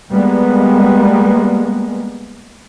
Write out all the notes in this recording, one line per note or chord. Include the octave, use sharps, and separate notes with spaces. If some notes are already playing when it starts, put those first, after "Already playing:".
G3 G#3 A#3 B3